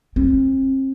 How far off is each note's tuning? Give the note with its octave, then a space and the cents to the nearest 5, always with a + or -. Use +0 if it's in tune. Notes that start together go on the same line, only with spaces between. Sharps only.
C4 +35